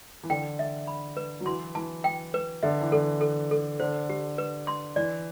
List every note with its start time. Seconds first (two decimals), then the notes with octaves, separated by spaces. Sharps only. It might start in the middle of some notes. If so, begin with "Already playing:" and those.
0.23 E3
0.30 D3 G5
0.59 E5
0.87 B5
1.17 B4
1.40 F#3
1.46 E3 C6
1.75 E3 A5
2.04 G5
2.34 B4
2.63 D3 E5
2.81 E3
2.92 D3 A4
3.21 A4
3.51 A4
3.80 D3 C5
4.09 G4
4.38 B4
4.67 C6
4.96 E3 D5